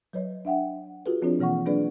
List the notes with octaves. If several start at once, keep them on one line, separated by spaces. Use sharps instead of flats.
F#3 B4 C#5 D#5
D4 E5 F#5 G5
F4 F#4 G#4 A4 B4
F3 C4 D4 F4 G#4 C#5
B2 E3 A#3 F#5 C#6
F#3 A#3 D4 G#4 B4 D5